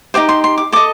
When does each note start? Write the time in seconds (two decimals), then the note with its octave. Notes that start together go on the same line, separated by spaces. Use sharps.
0.14 D#4 G4 C5 D6
0.29 C6
0.44 C6
0.58 D6
0.72 A4 D#5 D6